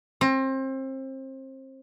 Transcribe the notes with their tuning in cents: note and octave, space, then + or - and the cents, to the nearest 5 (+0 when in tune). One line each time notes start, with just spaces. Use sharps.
C4 +30